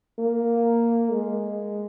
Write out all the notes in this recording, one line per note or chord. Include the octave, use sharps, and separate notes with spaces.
A#3
G#3